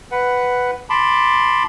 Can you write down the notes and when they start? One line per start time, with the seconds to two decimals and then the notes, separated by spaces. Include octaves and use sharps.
0.12 B4 F#5
0.90 A5 B5 C6 D6